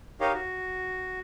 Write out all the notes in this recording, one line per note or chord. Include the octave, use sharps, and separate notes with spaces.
D#4 G4 A#4 C#5 D#5 F5
F#4